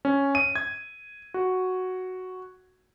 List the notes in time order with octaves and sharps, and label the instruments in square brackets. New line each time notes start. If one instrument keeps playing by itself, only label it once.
[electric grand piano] C#4
D#7
G#6
F#4